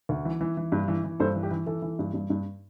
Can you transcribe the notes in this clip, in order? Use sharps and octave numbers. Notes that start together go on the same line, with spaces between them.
D2
E3
E3
E3
G2
E3
E3
G2 A4 C5
E3
G4
E3
E3 A4
E3
G2
G2
G2